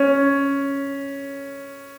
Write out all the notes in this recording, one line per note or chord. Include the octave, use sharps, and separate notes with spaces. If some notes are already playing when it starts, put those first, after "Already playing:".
Already playing: C#4